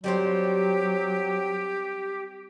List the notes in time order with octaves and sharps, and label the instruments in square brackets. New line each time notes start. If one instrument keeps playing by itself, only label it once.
[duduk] F#3 [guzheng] G3 C4 C5 [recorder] G4